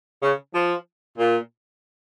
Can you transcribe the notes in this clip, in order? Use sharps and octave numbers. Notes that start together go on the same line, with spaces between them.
C#3
F3
A#2